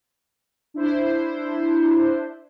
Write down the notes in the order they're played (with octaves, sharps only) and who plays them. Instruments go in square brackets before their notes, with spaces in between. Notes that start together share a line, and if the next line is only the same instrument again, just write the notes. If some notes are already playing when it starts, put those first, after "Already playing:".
[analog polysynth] D4 E4 C5